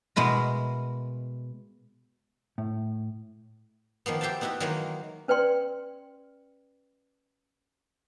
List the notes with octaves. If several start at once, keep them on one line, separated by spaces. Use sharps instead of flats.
B2 G#3 B3 E4 A#4
A2
D#3 F3 A#3 B3
G4 C5 E5 G5 A5
B3 D#4 E4 F#4 B4
D#3 E3 F#3 G#3 A#3
C#4 B4 D5 G5 C6